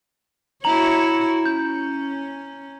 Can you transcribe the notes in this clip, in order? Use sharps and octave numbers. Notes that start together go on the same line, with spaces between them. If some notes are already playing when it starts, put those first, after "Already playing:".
E4 F#4 C#5 A#5 F#7
C#4 G6